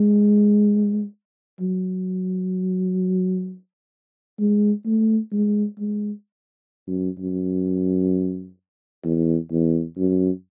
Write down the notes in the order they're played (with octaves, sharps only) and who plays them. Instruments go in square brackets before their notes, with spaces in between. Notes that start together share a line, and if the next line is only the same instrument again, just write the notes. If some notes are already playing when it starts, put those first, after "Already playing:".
Already playing: [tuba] G#3
F#3
G#3
A3
G#3
G#3
F#2
F#2
E2
E2
F#2